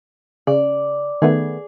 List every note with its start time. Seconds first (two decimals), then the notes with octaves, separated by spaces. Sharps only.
0.47 C#3 D5
1.22 D#3 A3 B3 G#4